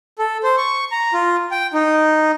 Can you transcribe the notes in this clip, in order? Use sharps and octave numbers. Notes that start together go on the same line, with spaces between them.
A4
C5
C#6
A#5
F4
G5
D#4